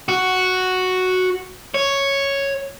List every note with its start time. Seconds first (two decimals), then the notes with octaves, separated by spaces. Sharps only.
0.09 F#4
1.74 C#5